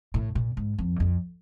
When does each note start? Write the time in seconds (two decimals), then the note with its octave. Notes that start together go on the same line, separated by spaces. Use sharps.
0.14 A2
0.35 A#2
0.57 G#2
0.79 F2
0.96 E2
1.00 F2